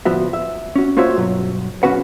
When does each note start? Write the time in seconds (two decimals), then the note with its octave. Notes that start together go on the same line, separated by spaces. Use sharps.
0.05 D2 A2 F3 B3 F#4 E5
0.33 E5
0.76 C#4 F#4
0.97 A#3 F4 F#4 C5 C#5 E5
1.16 G2 B2 F#3
1.83 B1 C#3 C#4 F#4 B4 F#5